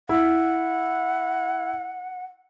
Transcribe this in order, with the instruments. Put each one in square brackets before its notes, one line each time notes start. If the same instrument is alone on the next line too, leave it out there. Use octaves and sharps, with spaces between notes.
[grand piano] E4 [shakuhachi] F#5